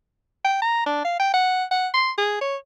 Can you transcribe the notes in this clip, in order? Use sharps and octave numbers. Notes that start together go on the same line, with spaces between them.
G5
A#5
D4
F5
G5
F#5
F#5
C6
G#4
C#5